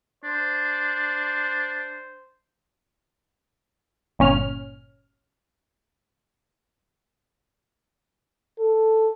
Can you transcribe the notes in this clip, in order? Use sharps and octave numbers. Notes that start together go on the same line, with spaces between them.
D4 C5
G1 A#2 C#4 F6
A4